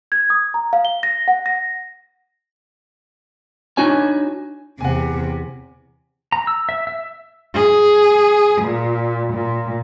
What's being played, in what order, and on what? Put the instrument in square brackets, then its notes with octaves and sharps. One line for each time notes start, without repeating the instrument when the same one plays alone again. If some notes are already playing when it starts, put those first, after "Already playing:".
[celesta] G#6
D#6
A#5
F5
G7
A#6
F#5
A#6
[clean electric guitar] D4 D#4 F#4 C#5 G#5
[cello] E2 C3 [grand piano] F#5 G#5
[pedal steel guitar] A#5
E6
E5
E5
[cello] G#4
A#2
A#2